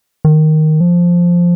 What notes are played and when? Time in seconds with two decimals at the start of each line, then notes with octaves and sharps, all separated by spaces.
0.25 D#3
0.81 F3